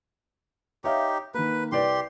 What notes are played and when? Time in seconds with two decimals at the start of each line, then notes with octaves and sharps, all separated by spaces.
0.84 D#4 G4 C#5 E5 F5
1.34 D#3 A#3 B4
1.72 C2 G4 B4 D5 C6